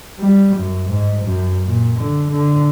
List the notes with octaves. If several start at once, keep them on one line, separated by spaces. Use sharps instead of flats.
G3
F#2
G#2
F#2
A#2
D3
D3